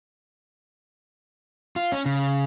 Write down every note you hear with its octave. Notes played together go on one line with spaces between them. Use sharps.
F4
C#4
C#3